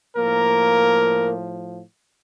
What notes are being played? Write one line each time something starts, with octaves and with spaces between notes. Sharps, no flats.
A2 F3 A#3 A#4